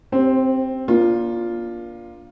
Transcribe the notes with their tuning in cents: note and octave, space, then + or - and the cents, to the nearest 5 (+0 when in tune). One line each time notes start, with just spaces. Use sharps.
C4 +0 G4 +0 C5 +30
A#3 +30 D4 -10 F4 +0